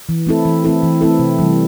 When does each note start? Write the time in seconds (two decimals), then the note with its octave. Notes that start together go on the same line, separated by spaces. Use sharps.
0.09 E3
0.27 A3 C4 E4 A4
0.45 E3
0.64 A3 C4 E4 A4
0.83 E3
1.01 A3 C4 E4 A4
1.19 C3
1.39 E3 G3